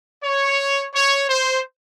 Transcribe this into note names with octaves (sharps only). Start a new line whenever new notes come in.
C#5
C#5
C5